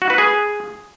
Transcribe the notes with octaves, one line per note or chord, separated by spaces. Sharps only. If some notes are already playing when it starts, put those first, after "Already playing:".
F#4
B4
G#4